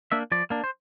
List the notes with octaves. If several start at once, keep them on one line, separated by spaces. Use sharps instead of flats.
A#3 D4 E5
F3 D5
A#3 D4
C5